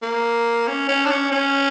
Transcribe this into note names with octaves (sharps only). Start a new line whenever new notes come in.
A#3
C#4
C#4
D4
C#4
C#4